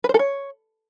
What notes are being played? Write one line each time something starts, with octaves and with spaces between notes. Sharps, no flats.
B4
C5
A4
C#5